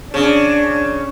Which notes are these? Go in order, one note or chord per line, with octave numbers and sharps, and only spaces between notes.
C#3 D4